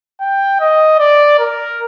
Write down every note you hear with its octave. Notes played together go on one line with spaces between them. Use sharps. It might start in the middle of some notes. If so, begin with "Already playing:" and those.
G5
D#5
D5
A#4